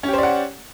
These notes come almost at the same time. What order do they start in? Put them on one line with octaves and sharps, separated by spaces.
C#4 G4 C5 D5 F#5